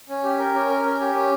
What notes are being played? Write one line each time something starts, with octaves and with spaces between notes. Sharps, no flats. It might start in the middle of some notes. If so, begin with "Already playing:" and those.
C#4
G4
A#4
C#4
A#4
C#4
G4
C#4